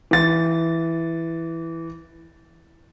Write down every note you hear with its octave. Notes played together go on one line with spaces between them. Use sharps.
E3 A6